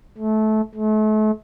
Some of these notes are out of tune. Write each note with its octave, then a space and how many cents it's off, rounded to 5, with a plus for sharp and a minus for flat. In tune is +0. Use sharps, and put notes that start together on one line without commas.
A3 -20
A3 -35